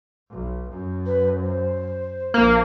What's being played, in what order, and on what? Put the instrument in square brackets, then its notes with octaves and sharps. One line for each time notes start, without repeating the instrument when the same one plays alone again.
[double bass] B1
F#2
[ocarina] B4
C5
[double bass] A#1 [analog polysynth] A#3